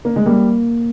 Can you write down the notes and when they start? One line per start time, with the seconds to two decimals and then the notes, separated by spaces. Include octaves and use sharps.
0.05 A#3
0.16 G#3
0.26 G3 A#3